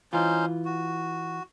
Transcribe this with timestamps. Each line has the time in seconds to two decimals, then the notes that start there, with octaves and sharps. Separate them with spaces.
0.13 E3 C#4 D#4 F4 C5
0.65 F#4